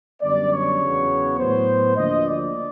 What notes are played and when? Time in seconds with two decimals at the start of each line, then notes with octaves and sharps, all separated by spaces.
0.21 F#2 D3 G3 B3 D5
0.50 C#5
0.80 E2 C#3 F#3 B3
1.38 A2 F#3 B3 C5
1.96 D2 D3 F3 A#3 D#5
2.25 D5